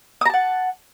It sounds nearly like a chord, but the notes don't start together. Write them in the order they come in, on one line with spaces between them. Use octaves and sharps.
D#6 A#5 A5 F#5